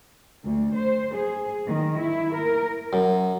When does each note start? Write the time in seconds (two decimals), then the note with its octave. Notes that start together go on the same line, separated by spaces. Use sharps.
0.43 D2
0.75 C5
1.14 G#4
1.67 D#3
1.99 E4
2.34 A#4
2.93 F#2